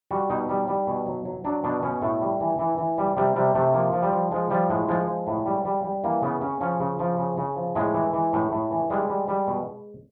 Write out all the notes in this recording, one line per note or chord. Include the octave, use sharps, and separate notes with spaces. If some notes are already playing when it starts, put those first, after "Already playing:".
G3 F#4
B2 D#4
G3
G3
B2
F#3
F#3
F#3 D4
B2 D4
B2 C#4
A2 A3
G3
E3
E3
E3
G3
C3 G3
C3 G3
C3 A3
F3 A#3
F3
G3
F3
F3 G#3
F3 G3
A2 G#3
F3 G#3
F3
A2
G3
G3
G3
E3 A#3
C#3 B3
C#3 C#4
F3 C#4
C#3
F3
C#3
C#3
F3
A2 G#3
E3
E3
A2
A2
E3
G3 G#3
G3
G3
B2